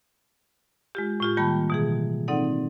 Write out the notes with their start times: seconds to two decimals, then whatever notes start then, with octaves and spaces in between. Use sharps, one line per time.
0.95 G#3 F4 G4
1.20 A2 F4 G4
1.37 D#3 G3 A#3 G5 A5 B5
1.70 B2 E3 G#4
2.28 C4 D#4 A4 D5 F#5